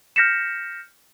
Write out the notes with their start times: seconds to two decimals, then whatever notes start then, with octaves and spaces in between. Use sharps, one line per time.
0.16 F6 G6 A#6 B6 C#7 E7